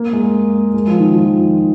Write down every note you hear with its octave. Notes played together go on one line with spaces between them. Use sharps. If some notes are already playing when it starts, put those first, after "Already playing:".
Already playing: A#3
G#3
G#3
F3
D#3
F3